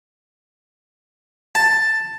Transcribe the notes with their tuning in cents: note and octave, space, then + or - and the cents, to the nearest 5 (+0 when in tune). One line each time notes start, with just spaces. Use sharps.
A5 +5